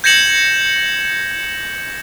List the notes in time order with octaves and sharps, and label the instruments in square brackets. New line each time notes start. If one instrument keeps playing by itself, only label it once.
[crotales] G6 G#6 A#6 C#7 E7 F#7